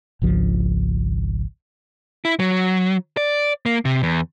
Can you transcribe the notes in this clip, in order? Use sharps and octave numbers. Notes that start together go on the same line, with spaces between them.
G#1 C#2 F3
E4
F#3
D5
A#3
C3
E2